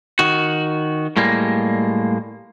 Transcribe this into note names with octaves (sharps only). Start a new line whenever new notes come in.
D#3 F#4
A2 G3 G#3 A#3